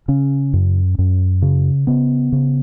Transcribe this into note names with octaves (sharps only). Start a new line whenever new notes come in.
C#3 C#4
F#2
F#2
C#3
C#3 B3
C#3